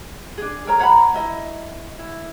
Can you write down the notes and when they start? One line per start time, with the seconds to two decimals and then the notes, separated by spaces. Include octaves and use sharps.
0.37 D4 G#4
0.66 A4 A#4 C#5 A#5
0.79 C#5 F#5 A#5 B5
1.14 E4 D#5
1.99 E4